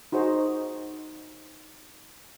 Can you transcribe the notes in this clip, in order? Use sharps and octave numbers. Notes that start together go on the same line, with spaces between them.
D#4 F#4 G#4 C5 D#5